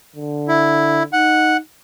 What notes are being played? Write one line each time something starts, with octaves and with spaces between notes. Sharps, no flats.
D3
E4
D#4 F#5